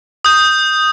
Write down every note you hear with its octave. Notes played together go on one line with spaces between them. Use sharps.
D#6 G6